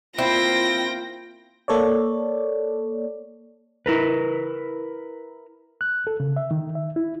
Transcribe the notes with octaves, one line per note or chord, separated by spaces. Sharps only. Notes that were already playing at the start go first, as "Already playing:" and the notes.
A#3 C4 E4 F4 G5 A#6
A#3 A4 C#5 D5
E4 A#4 B4
F#6
A4
C#3
E5
D#3
E5
E4